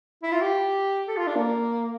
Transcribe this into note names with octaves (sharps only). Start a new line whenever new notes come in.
E4
F4
G4
A4
F4
D4
A#3